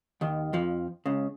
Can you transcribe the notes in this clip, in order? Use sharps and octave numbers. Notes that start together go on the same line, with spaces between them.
D#2 D#3
F2 F3
C#2 C#3